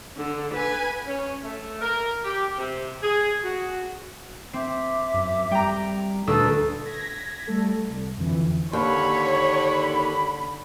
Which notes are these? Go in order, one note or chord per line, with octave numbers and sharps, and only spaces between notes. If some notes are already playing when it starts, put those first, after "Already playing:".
D3
B4 G#5
C#4
A3
A#4
G4
C3
G#4
F#4
C4 E5 D6
F#2
G3 G5 A#5
D2 A#2 A4 B4 D#6 E6
G#6 A#6 B6
G3 A3 A4
C2
F2 D3 E3
D#2 D3 C#5 B5